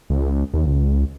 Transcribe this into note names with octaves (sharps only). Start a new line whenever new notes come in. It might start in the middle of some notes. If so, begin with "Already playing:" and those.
C#2
D#2
C#2